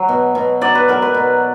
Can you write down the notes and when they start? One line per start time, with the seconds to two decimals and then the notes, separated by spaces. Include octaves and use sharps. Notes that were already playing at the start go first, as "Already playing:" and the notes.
Already playing: F#3
0.09 B2
0.35 B2
0.61 F#3 D5
0.75 B4
0.88 F#3 A#4
1.02 B4
1.14 B2